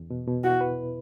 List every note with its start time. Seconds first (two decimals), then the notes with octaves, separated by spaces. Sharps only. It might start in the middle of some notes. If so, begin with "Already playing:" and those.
Already playing: E2
0.10 B2
0.27 B2
0.44 E4 F#4
0.61 B4